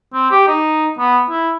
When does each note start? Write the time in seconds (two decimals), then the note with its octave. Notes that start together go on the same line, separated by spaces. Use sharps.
0.14 C4
0.31 G4
0.48 D#4
0.99 B3
1.30 E4